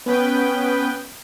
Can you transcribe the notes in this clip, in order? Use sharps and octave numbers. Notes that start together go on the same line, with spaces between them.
B3 C#4 B4 G5